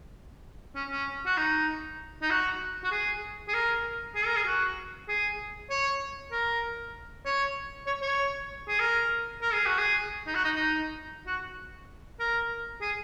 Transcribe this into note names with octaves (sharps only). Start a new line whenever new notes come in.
C#4
C#4
F#4
D#4
D#4
F#4
F#4
G#4
G#4
A#4
G#4
A#4
G#4
F#4
G#4
C#5
A#4
C#5
C#5
C#5
G#4
A#4
A#4
G#4
F#4
G#4
D#4
F#4
D#4
D#4
F#4
A#4
G#4